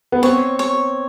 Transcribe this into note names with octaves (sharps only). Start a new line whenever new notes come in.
B3
C4 C#5
C#5